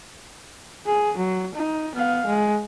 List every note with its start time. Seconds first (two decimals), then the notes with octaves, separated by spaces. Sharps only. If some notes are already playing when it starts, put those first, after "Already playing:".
0.86 G#4
1.17 F#3
1.55 D#4
1.95 B3 F5
2.26 G#3